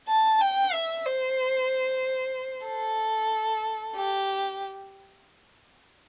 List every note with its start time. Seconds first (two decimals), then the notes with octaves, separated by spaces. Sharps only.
0.08 A5
0.41 G5
0.73 E5
1.06 C5
2.66 A4
3.96 G4